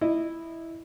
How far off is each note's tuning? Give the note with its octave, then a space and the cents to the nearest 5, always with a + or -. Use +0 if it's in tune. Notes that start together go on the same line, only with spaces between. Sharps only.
E4 +0 D#5 -20